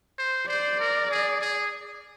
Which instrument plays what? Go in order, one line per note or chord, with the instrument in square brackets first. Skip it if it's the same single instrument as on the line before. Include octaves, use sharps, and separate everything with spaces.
[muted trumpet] C5
[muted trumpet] C5 [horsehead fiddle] D5
[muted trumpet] A#4
G#4
G#4